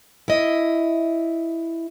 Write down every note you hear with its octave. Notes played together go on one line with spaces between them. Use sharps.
E4 D#5